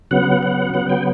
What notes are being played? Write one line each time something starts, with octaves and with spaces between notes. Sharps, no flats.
C#3 F#3 B3 F#5
F#5
C#3 F#3 B3 F#5
G5